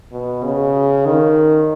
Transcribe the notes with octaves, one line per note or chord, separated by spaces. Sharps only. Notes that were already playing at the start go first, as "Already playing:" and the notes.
B2
C#3
D#3